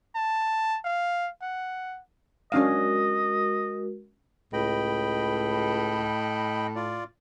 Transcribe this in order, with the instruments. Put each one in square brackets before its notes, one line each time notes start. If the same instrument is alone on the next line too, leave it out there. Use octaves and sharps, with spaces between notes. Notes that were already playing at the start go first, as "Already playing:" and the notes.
[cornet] A5
F5
F#5
[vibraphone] G#3 F#4 A#4 [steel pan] C#4 D4 F5 [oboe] D#5
[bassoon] C#2 [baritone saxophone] A2 [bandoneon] D#5 G5 B5
[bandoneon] F4 D5